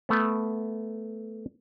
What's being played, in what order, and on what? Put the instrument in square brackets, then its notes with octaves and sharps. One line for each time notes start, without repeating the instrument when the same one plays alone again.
[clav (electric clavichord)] A3 B3